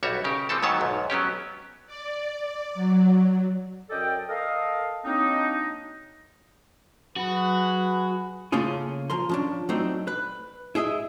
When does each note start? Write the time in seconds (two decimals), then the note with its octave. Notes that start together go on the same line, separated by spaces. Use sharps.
0.03 B1 G3 F#4 C#5 E5
0.24 C#3 G4 A#4
0.49 E3 F3 C4 A4 A5
0.62 G#2 D#3 F#3 B3 C#5 A5
0.81 B1 G#2
1.10 F#3 B3 C#4 G4
1.87 D5
2.75 F#3
3.90 F#2 A4 D5 D#5 G5
4.28 A4 A#4 D#5 F5
5.04 F#3 A#3 C4 D4 D#4
7.16 F#3 F#4 G#4 B4
8.52 C#3 A3 A#3 C#4 F4 G#4
9.10 F3 A#4 C6
9.29 F3 C#4 D4
9.69 F#3 A3 C4 D4 D#4
10.07 B4
10.75 E4 G#4 D#5 E5